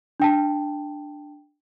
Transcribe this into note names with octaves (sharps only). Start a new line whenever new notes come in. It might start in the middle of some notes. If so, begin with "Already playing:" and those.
D4 G5 A5